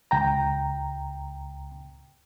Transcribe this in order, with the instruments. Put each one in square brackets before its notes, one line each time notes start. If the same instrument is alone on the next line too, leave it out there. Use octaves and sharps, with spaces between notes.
[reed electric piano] C#2 G5 A#5